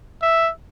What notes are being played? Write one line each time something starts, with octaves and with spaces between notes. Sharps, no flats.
E5